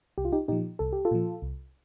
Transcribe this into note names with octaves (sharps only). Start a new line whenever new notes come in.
C2 G4
F4
D#4 G4
A#2 F3 D#4 G4
C2 A4
G4
F4 A4
A#2 F3
C2